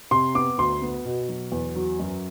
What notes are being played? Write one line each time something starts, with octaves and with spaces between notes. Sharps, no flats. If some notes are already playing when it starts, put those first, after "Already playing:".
C3 C6
B3 D6
D2 C6
B3
B2
F#3
E2
F#3
F#2